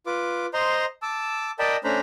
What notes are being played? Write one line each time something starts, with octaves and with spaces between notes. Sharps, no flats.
F4 B4 D6
C5 D#5 A#5 C6
A5 D6 E6
A#4 D5 D#5 G5 A5 B5
A3 C#4 D4 C5 A#5 B5